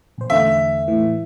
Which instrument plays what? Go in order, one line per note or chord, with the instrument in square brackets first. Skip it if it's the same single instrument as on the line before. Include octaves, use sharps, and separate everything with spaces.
[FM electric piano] A#1 C5
[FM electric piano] E2 D3 A3 [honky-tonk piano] E5
[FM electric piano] A2 E3